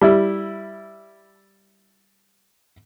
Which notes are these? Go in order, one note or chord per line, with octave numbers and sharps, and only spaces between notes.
G3 E4